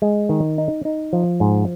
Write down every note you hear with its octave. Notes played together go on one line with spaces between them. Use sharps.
G#3
D#3
D#4
D#4
F3
G#2